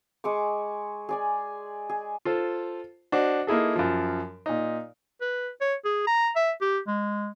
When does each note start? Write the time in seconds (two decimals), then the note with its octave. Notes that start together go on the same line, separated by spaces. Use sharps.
0.24 G#3 G#4 C#6 D6
1.09 G#4 D5 G#5
1.89 G#4
2.25 F4 A4 C5
3.12 D4 F#4 C5 D#5
3.47 A#3 D#4 E4 G#4 A4
3.76 F#2 F3
4.46 A#2 D#4
5.21 B4
5.61 C#5
5.85 G#4
6.07 A#5
6.36 E5
6.61 G4
6.87 G#3